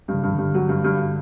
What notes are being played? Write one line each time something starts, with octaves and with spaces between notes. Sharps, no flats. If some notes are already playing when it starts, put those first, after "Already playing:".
G2 C#3
G2
C#3
G2 D3
F#3
G2
G2